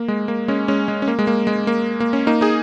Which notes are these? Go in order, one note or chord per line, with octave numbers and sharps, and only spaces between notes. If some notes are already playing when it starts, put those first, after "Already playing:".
Already playing: A#3
G#3
A#3
G#3 C#4
G#3 C#4
G#3
C#4
A#3
G#3
A#3
G#3
A#3
A#3
C#4
A#3 D#4
D#4 G#4